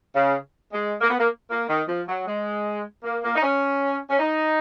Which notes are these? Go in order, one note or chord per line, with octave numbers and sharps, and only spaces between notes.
C#3
G#3
A#3
B3
A#3
A#3
D#3
F3
F#3
G#3
A#3
A#3
D#4
C#4
C#4
D#4